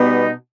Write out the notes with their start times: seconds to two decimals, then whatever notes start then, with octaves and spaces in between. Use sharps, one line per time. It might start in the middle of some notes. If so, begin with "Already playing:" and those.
Already playing: B2 G3 B3 D#4